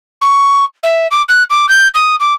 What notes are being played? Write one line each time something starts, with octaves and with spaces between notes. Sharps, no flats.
C#6
E5
D6
F#6
D6
G6
D#6
D6